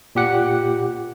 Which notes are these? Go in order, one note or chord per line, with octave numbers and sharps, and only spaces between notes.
A#2 G4 F#5